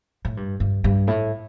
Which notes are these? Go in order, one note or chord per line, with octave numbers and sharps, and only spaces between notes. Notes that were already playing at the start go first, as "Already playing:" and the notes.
A2
G2
G2
G2
A2